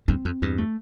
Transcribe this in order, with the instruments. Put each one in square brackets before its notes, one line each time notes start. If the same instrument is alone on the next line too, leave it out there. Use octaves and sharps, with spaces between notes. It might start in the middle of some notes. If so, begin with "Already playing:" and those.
[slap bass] E2 G2 [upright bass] C4
[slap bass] F2
E2 G2
[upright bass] A3